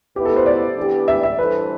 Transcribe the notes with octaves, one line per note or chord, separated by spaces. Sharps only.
B2 B3 E4 G4 B4
A4
C5
D5
E3 B3 D4 G4
E5
E5
E3 G3 D4 A4 B4 C5